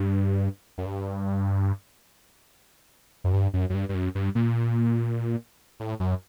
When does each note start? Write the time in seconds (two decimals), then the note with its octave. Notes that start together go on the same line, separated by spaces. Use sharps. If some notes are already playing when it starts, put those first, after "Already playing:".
Already playing: G2
0.78 F#2
0.86 G2
3.24 F#2
3.33 G2
3.53 F#2
3.70 F#2
3.74 G2
3.89 G2
3.94 F#2
4.15 G2
4.35 A#2
5.80 A2
6.00 F#2